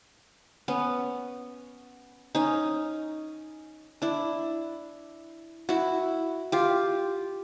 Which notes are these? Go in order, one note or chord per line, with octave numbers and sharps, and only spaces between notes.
B3 C#4
C#4 D#4
D4 E4
E4 F#4
F4 G4